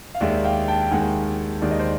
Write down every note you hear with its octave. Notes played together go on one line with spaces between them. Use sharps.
F5
D#2 D#3 G#3 D5 E5
F5 G5
G5 A5
G5
D#2 D#3 G#3 F#5 G#5
D#2 D#3 G#3 D5
D#5
C5 D5